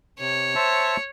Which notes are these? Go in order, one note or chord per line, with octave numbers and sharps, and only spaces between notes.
C3 C#5
C5 E5 A5